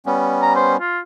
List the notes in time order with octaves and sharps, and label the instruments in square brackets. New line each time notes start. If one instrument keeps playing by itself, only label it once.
[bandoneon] G3 B3 C#4
[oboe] A#5
C5
F4